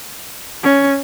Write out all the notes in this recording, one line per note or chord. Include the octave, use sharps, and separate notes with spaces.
C#4